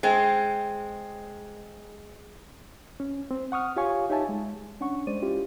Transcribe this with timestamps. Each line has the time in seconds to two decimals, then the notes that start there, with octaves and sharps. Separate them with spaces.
0.03 G#3 C4
3.00 C#4
3.31 C4
3.52 F#5 C#6 D#6 F6
3.76 F4 G4 C#5 F5 G#5 C#6
4.10 D#4 G4 C#5 E5 G#5 A5
4.29 G#3
4.80 C#4 D4 F#5 C#6
5.07 G#3 C5 D5 D#7
5.22 G#3 C#4 E4 F4 G4